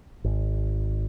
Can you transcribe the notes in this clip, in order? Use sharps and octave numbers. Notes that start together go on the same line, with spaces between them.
G#1